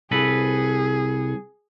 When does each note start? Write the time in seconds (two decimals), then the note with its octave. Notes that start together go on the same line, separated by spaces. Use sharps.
0.11 C2 G#4 A4 B4